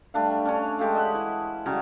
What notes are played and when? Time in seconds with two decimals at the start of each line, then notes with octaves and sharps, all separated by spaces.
0.14 G3 A3 D4 F5
0.45 C#4 D4 C#5
0.79 G#3 G4 A4 F5
0.95 D#5 E5 F#5
1.15 E3
1.66 C#3 F#3 G3